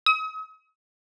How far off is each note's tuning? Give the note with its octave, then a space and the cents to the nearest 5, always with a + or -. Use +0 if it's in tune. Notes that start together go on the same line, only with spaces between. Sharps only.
D#6 +40